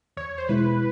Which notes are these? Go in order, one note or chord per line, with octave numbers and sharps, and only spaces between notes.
E2 C#5
C5
B2 G#3 B3 E4 B4